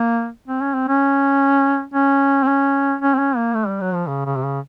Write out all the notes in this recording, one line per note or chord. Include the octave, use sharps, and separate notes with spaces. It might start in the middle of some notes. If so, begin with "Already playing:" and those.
Already playing: A#3
C4
C#4
C4
C#4
C#4
C4
C#4
C#4
C4
C#4
A#3
A3
G3
F#3
F3
C#3
C#3
C3
C#3